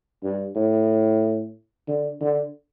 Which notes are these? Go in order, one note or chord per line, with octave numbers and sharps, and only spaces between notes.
G2
A2
D3
D3